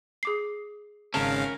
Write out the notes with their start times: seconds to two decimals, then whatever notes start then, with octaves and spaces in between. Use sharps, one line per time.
0.23 G#4 D6 C7
1.14 G#1 C#3 C#4 A#4 F5 A5